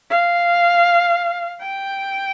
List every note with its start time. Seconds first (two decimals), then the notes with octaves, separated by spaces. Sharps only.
0.10 F5
1.62 G5